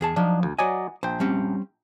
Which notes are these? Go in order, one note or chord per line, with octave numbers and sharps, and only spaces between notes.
E2 G#4 A5
F3 F#3 D4 D#4
D2
F#3 D5 D#5 F#5 G#5
A#1 C5 G5
G3 C4 C#4